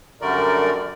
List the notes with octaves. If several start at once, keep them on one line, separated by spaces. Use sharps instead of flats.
F#2 D3 G3 A3 A#4 D5